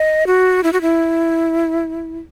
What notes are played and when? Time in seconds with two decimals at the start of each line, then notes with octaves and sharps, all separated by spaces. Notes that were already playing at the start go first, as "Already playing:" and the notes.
Already playing: D#5
0.27 F#4
0.63 E4
0.73 F#4
0.81 E4